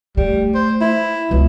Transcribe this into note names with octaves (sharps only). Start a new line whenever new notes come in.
G3 A3
C5
E4
C#2 B2 F4